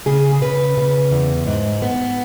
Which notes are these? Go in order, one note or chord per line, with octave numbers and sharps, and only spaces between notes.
C#3 G#4
C#3 B4
C#3
E2
G#2
B3